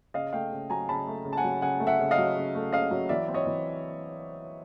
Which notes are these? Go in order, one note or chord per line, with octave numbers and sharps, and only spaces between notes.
C#3 D#5 F5
A3 F5 G5
C#3
F#3 G#5 A#5
C#3 A5 B5
A3
C#3
A5
F#5 G#5
F#3
C#3 F#5 G#5
A3
E5 F#5
C#3
D#5 F5
F#3
C#3
A3
C#3 D#5 F5
F#3
E3 D5 E5
C4
C#5 D#5
E3